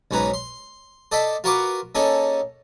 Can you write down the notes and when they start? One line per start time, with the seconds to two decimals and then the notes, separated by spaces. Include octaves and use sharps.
0.11 B1 G#2 C#4 B4 A#5
0.34 C6
1.12 A4 D5 D#5 G5 B5
1.44 F4 F#4 A#4 B4 C#6 D6
1.95 A#3 C#4 D#4 G#4 A4